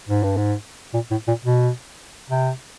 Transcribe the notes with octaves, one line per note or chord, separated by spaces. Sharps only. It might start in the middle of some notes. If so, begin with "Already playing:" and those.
G#2
G2
G#2
A#2
A2
A#2
B2
C3